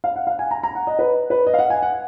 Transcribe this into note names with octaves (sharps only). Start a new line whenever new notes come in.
F5
F#5
F5
G#5
A#5
A#5
F#5
D#5
B4
B4
D#5
F5
F#5
G#5
F#5